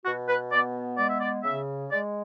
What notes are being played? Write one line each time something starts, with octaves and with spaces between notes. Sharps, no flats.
B2 F#4
B4
B3 D5
G#3 D5
E5
D5
C#3 E5
G#3 D5